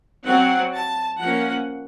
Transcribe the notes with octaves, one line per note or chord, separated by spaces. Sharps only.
F#3 C4 F#5
A5
F3 A#3 C#4 F#5